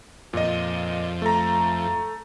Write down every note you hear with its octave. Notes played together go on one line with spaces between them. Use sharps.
F2 A#2 D#5
A3 A#5